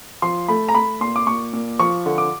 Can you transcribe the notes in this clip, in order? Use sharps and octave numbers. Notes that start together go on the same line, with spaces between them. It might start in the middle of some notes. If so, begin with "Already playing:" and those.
F3 C6
A3 B5
A#5
A3 B5
A#2 C6
D6
A#2 C#6
A#2
F3 C#6
D3
D6